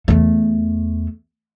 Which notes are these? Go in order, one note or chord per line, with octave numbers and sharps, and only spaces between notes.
E2 A3